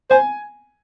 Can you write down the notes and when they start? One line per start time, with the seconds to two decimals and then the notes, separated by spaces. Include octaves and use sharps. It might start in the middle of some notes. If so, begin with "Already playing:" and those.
0.10 C5 G#5